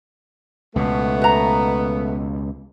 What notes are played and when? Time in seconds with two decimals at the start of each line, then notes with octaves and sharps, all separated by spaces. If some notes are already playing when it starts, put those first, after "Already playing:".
0.76 C#2 B2 A3 B3
1.21 B4 A#5